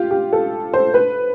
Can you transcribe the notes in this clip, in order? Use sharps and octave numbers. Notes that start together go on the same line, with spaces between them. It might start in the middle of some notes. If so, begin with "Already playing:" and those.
Already playing: F4 G4
G4
A4
C5
B4